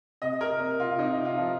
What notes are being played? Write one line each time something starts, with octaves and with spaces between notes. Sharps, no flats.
C3 D#5
A#4
C3
F4
C3 D#4
F4
F3